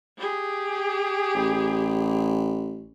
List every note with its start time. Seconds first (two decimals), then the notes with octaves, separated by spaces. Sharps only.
0.18 G4 G#4
1.35 A1